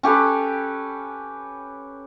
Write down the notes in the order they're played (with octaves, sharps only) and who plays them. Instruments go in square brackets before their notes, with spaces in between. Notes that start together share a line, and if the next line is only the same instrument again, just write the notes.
[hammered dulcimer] C#4 G4 A4 B4